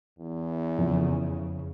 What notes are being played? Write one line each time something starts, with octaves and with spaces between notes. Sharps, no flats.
E2
F2 C#3